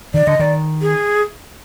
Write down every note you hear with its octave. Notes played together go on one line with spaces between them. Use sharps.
D#3 D5
D3 D#5
D#3 D5
G#4